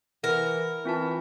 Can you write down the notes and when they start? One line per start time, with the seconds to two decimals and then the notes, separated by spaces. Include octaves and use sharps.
0.24 E3 A#4 F#5 A#6
0.85 E3 C4 F4 A5